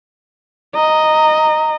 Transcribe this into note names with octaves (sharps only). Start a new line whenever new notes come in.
D#5 A#5